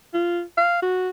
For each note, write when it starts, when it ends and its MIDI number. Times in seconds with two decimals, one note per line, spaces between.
0.14 0.41 65
0.57 0.82 77
0.82 1.09 66